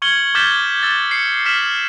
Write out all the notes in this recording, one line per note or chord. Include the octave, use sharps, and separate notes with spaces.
C#6 F6 G#6 C#7 F#7 G7
D6 F6 G6 A6 B6 E7
E6 A6
C7 C#7
F6 B6 E7 F#7